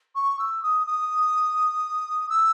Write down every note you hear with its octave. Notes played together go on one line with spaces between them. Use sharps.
C#6
E6
D#6
D#6
E6